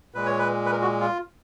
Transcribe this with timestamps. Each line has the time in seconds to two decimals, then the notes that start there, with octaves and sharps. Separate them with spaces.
0.14 A#2 G#3 B4
0.26 C#5
0.38 B4
0.66 B4
0.71 A#4
0.82 F#4
1.01 F4